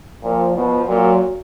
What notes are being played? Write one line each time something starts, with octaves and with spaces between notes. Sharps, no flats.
A#2 F3
B2 F3
A#2 F#3